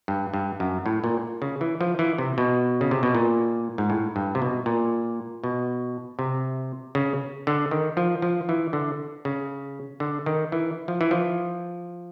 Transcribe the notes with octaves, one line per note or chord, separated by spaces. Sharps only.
G2
G2
F#2
A2
A#2
C#3
E3
F3
E3
C3
B2
C#3
C3
B2
A#2
G#2
A2
G2
C3
B2
A#2
B2
C3
C#3
D3
D#3
F3
F3
E3
D3
C#3
D3
D#3
E3
F3
E3
F3